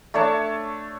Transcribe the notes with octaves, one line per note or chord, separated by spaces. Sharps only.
A3 D4 C#5 A5